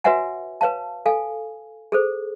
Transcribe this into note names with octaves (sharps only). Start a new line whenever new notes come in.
F#4 B4 C#5 E5 F#5 G#5
B4 C#5 F5 A5
A4 F5 G#5
G#4 A4 C5